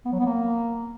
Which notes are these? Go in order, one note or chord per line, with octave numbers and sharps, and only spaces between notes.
B3
F#3
B3
A#3